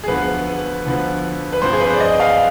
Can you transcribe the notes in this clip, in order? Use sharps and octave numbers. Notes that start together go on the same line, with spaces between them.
G#4
D2 D3 F3 B3 B4
D2 D3 F3 B3
B4
G2 F3 C4 C5
G#4
B4
C5
D5
D#5
F5